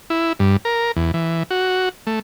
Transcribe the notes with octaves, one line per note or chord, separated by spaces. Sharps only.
E4
G2
A#4
E2
E3
F#4
A3